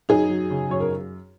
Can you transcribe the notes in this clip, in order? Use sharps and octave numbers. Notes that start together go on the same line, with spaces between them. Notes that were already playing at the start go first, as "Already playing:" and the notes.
F#2 D#4 G#4
F#3
C#3
F#2 C#5
A#4